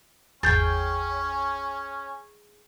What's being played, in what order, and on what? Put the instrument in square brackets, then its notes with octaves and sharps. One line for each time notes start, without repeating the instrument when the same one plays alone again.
[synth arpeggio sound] G#1 E2 [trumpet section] C#4 [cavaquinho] G#4 G5 [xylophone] G6 A6